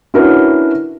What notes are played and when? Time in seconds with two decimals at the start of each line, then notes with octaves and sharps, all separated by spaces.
0.14 C#4 D4 E4 F#4 A#4 B4